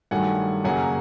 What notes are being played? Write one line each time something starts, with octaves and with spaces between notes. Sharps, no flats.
G2 D#3 F#3 A3 F#5 G#5
F#2 C#3 F#3 A#3 F#5 G#5